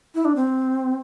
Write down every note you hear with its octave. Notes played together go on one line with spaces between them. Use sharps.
E4
D4
C4